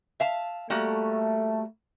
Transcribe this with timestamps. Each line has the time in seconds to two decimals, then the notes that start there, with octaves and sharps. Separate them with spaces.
0.20 E5 F5 A5
0.70 G3 A3 A#3 F#4